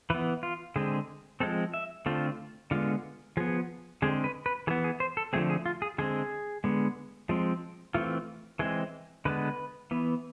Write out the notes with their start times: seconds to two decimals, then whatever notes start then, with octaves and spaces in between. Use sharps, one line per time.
0.10 E3 B3 B4
0.43 F4
0.76 D3 G#3 C4 G#4
1.40 F3 G#3 C4 A4
1.74 E5
2.06 D3 A3 C4 F4
2.71 D3 G#3 B3 F4
3.37 F3 B3 G#4
4.02 D3 G#3 C4 G#4
4.24 B4
4.46 B4
4.67 E3 G#4
4.71 B3
4.84 G#4
5.00 C5
5.17 A4
5.33 D3 F3 A3 C4 G#4
5.50 G#4
5.66 F4
5.82 G#4
5.98 D3 G#3 C4 G#4
6.64 D3 G#3 B3
7.29 F3 G#3 C4
7.94 E3 A3 C4 F4
8.59 E3 G#3 C4 G#4
9.25 D3 G#3 B3 B4
9.91 E3 B3